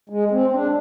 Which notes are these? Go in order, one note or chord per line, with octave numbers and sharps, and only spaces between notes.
G#3
C4
D4